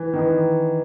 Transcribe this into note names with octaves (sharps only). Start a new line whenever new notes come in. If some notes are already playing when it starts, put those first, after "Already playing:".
Already playing: E3
D#3
E3